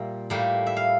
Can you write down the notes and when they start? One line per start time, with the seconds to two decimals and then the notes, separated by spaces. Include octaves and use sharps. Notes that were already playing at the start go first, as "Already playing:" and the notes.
Already playing: A#2 G3 A#3 E5
0.30 A2 G3 A#3
0.66 E5
0.77 F5